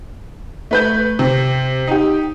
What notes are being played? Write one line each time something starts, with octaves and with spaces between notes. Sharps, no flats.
A3 B4 G6
C3
D#4 G4